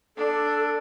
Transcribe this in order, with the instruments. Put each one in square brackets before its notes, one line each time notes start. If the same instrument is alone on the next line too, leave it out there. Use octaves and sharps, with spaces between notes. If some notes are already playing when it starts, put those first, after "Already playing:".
[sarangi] D4 [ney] A4